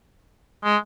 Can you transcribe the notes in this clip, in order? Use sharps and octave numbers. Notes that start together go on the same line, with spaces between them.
G#3